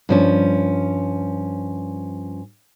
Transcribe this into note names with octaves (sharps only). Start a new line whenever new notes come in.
G2 F3 C#4